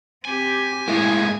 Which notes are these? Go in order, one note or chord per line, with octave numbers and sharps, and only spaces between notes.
C4 G4 G#5
A2 G#3 A#3 E4 G#4